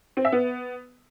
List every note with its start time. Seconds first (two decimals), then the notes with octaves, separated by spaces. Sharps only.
0.17 C4
0.25 E5
0.32 B3